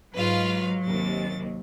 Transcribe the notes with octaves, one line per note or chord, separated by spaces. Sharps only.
G#2 F#3 F4 B4 F5
D#2 C3 A6